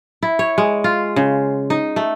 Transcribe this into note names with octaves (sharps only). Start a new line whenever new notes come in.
E4
C#5
G#3
F4
C#3
D#4
A3